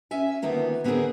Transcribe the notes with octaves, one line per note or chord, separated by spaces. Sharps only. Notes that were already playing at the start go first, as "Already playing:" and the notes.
C#4 E5 G#5
D2 D#3 A#3 B3 F4
D3 B3 C4 F#4 G#4 A#4